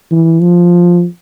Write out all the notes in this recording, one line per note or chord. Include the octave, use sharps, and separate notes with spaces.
E3
F3